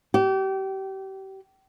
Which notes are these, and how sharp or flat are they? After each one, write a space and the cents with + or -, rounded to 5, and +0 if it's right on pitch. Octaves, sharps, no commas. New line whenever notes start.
G4 -30